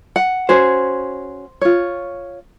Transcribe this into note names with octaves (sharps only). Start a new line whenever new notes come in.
F#5
C#4 F#4 G#4 C5
F4 C#5